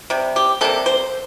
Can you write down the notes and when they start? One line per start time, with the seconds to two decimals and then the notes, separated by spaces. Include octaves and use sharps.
0.10 C3 G3
0.36 G4
0.61 C3 G3 A#3 A4
0.86 C5